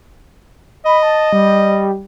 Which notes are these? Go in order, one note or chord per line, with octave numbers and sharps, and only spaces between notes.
D#5 B5
A5
G3